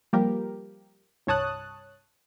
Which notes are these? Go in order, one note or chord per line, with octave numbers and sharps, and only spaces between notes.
F3 G3 A#3 G4 A#4
C2 G2 C#5 A5 D#6 F#6